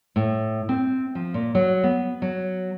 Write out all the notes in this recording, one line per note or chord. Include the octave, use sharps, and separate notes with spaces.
A2
C4
F3
A#2
F#3
B3
F#3